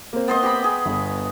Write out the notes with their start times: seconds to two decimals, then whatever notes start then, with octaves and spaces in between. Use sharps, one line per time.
0.13 A#3 C4
0.28 B3 C5 D#5
0.43 G4 B5
0.64 G#4
0.86 G1